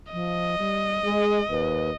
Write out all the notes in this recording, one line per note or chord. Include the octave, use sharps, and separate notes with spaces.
F3 D#5
G3
G#3 G#4
D#2 B4